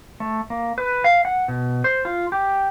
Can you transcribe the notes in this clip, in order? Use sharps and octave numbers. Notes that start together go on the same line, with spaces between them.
A3
A#3
B4
F5
F#5
B2
C5
F4
G4